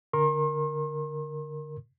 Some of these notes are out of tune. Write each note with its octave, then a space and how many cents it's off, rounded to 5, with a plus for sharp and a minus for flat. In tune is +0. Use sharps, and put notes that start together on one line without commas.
D3 +0 A#4 +0 C6 +45